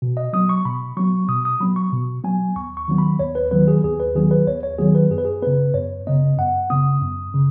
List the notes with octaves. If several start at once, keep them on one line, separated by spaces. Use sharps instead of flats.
B2
D#5
F#3 B3 D#6
C#6
B2 B5
F#3 B3 C#6
B2 D#6
D#6
F#3 B3 B5
C#6
B2
F#3 B3 G#5
D#2 C#6
C#6
D#3 F#3 B3
B5
D#2 C#5
B4
D#3 F#3 B3 B4
G#4
D#2 G#4
B4
D#3 F#3 B3 G#4
B4
D#2 C#5
C#5
D#3 F#3 B3 G#4
B4
F#2 G#4
B4
G#4
C#3 B3 B4
F#2 C#5
C#3 B3 D#5
F#2 F#5
C#3 B3 D#6
F#2
C#3